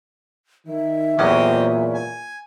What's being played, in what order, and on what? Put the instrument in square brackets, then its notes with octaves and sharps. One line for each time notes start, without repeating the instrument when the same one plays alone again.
[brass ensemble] D#3 [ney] E5
[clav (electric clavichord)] E2 F#3 C#4 [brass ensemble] A#2 [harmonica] C4 G4 D#5
[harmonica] G#5